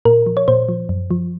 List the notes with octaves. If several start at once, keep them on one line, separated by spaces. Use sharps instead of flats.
A#2 A#4
F3
C#5
A#2 C5
F3
F#2
F3